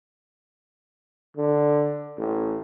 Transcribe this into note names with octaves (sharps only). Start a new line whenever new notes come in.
D3
A1